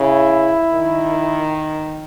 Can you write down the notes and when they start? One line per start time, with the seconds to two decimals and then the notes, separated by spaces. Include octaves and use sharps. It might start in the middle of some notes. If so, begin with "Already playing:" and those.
Already playing: C#3 E4
0.69 D#3